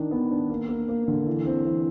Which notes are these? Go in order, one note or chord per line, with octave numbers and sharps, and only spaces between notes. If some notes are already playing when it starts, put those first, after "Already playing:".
Already playing: D#3 D4
B3
D4
A#3
A#3
A#3
D3
E3
C4
E3